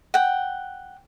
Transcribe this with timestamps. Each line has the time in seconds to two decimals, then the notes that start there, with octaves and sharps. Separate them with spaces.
0.14 F#5 G5